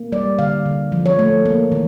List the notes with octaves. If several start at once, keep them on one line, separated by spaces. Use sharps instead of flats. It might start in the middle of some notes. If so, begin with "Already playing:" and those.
Already playing: A#3
G3 D5
D3 F5
D3
F3
C#5
A3
A#3
E3